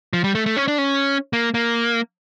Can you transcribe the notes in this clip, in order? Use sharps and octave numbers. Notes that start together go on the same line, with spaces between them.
F3
G3
A3
A3
C#4
D4
C#4
A#3
A#3